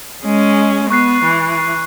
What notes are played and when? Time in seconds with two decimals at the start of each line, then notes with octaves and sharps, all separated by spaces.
0.23 G#3 C#4
0.90 B3 C#6 F#6 C7
1.24 E3